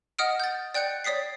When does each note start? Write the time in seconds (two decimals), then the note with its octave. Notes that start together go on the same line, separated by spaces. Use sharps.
0.19 D#5 F#5 D#6 F6 D7
0.40 G6 A6
0.74 D5 G5 F#6 G6 C#7
1.04 C#5 D5 D#6 B6 C7